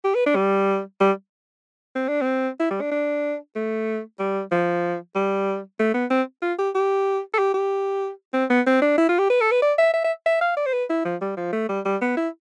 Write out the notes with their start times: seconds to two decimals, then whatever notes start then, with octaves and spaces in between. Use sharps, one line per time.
0.04 G4
0.15 B4
0.26 D4
0.36 G3
1.00 G3
1.96 C4
2.08 D4
2.21 C4
2.60 E4
2.71 G3
2.81 D4
2.91 D4
3.56 A3
4.19 G3
4.52 F3
5.15 G3
5.79 A3
5.94 B3
6.10 C4
6.42 F4
6.59 G4
6.75 G4
7.34 A4
7.39 G4
7.54 G4
8.34 C4
8.50 B3
8.67 C4
8.82 D4
8.98 E4
9.09 F4
9.19 G4
9.30 B4
9.40 A4
9.51 B4
9.62 D5
9.78 E5
9.93 E5
10.04 E5
10.26 E5
10.41 F5
10.57 D5
10.66 C5
10.73 B4
10.90 E4
11.05 F3
11.21 G3
11.37 F3
11.53 A3
11.69 G3
11.85 G3
12.01 B3
12.17 E4